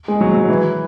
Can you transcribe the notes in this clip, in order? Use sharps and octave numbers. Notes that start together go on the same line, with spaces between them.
G#3
F#3
F#3
E3